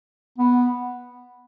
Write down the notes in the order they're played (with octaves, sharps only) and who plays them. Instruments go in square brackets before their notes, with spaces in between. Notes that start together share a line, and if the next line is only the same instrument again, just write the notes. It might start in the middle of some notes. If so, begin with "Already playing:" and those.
[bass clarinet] B3